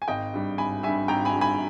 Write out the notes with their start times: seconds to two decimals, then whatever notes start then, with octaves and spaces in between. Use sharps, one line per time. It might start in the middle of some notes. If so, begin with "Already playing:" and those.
0.02 G#5
0.08 G#1 D#5 G5
0.34 G2 G3
0.58 G#1 G#5 B5
0.83 G2 G3 E5 G#5
1.08 G#1 G5 A#5
1.25 G#5 B5
1.33 G2 G3
1.41 G#5 B5